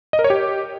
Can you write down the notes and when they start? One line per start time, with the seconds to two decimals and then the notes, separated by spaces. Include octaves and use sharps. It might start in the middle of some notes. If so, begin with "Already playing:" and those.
0.13 D#5
0.19 A#4
0.24 C#5
0.30 G4